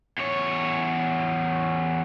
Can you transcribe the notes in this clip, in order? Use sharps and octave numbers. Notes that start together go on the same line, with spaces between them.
E2 C#5